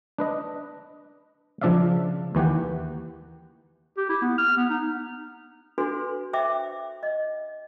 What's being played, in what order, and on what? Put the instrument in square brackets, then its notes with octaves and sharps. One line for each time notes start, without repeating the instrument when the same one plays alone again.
[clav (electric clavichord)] D4 B4 D#5
C#3 F3 D4 D5 E5 F5
D#2 E3 G4 F#5
[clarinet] G4
E4
B3
F6
B3
D#4
[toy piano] D4 F#4 A4 B4 C6
C5 E5 G5 D6
D#5